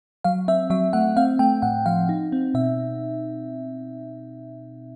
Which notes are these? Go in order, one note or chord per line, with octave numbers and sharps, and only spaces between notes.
F#3 F5
C4 E5
F#3 E5
A3 F#5
C4 F5
A3 G5
A2 F#5
F3 F5
D#4
C4
B2 E5